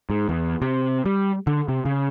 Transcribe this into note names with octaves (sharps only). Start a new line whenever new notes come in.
G#2
E2
C3
G3
D3
C3
C#3